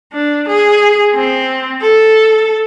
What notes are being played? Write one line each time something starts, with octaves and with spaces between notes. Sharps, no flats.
D4
G#4
C4
A4